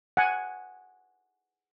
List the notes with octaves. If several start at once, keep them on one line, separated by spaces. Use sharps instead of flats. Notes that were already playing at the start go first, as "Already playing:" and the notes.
F#5 G#5